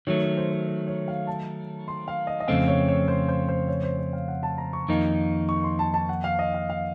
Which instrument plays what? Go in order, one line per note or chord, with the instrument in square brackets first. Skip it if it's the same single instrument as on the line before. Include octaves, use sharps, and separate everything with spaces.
[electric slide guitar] D#3 F#3 A3 [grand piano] C#5
[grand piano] C#5
C5
C5
C#5
C#5
F5
A5
C6
F5
D#5
D#5
[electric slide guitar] F2 C#3 A3 C4 [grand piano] F5
[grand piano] C#5
C#5
C5
C5
C5
C#5
C5
C#5
F5
F#5
A5
A#5
C#6
[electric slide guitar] F2 D#3 A#3 D#4
[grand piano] C#6
C6
A5
A5
F#5
F5
D#5
F5
F5